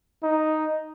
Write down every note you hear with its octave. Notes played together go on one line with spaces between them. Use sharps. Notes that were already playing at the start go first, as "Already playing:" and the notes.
D#4